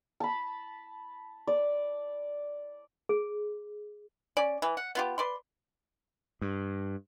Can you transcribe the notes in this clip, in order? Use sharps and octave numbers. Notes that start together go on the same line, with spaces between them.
A5 B5
D5
G#4
C#4 D5
E3
F#5
B3 F4 G4
B4 D5 C6
G2